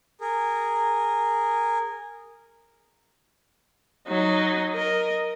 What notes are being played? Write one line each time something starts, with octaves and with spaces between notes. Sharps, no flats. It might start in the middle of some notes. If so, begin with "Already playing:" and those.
G#4 A#4
F#3 D#4
A#4 D#5